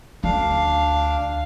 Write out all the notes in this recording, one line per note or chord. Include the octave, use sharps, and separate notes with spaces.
D2 D4 F5